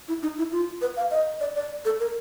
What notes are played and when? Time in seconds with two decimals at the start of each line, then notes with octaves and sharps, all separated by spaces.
0.08 E4
0.23 D#4
0.38 E4
0.52 F4
0.82 B4
0.97 F5
1.11 D#5
1.40 D5
1.55 D5
1.85 A4
2.00 A#4